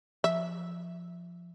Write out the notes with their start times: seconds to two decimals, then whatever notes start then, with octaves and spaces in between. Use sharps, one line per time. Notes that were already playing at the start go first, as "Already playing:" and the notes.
0.24 F3 E5